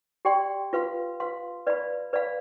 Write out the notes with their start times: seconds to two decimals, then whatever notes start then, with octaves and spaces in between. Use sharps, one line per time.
0.25 G4 D5 G5 C6
0.73 F4 B4 F5 C6
1.20 F4 B4 F5 C6
1.67 B4 D5 F5 B5
2.13 B4 D5 F5 B5